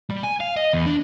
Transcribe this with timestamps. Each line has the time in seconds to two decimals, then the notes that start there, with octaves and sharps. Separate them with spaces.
0.11 G3
0.24 G#5
0.40 F5
0.57 D#5
0.73 E2
0.86 D4